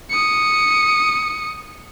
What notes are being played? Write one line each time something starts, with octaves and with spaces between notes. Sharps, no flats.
D#6 C#7